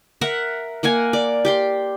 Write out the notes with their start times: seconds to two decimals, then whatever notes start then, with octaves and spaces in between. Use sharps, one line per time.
0.21 A#4 E5 F#5
0.83 A#3 A#4 F#5 G#5
1.13 D5
1.45 G4 G5 C6